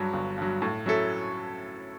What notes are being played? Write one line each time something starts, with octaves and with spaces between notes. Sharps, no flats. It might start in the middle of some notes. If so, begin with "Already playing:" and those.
Already playing: G2 F#3
G1
G2 F#3
A2
F#3 C#4 E4 A4